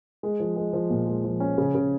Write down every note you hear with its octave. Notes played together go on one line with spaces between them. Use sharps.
G#3
F3
G#3
F3
A#2
G#3
F3
C#4
C#3
C#3